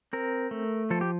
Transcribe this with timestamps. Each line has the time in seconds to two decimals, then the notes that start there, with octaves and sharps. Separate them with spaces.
0.13 C4 A#4
0.51 A3
0.90 F3 A4
1.01 G4